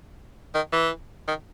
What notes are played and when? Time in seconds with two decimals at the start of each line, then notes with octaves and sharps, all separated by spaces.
0.55 D#3
0.73 E3
1.28 D#3